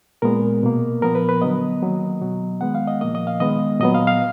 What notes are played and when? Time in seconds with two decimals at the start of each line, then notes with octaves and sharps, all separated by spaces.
0.22 A#2 G#3 B3 A#4
0.63 B2 A#3
1.02 A#2 F3 B3 A#4
1.15 B4
1.29 B4
1.41 D3 F#3 B3 D#5
1.82 D#3 F#3 A#3
2.21 B2 F#3 B3
2.61 D#3 G#3 B3 F#5
2.75 F5
2.87 D#5
3.01 A#2 F3 A#3 D#5
3.15 D#5
3.27 F5
3.40 D#3 G#3 B3 D#5
3.80 A#2 F#3 B3 D#5
3.94 F5
4.07 F5